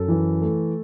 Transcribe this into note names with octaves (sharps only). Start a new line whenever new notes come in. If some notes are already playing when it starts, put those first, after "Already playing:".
Already playing: F#2 A4
E3
A3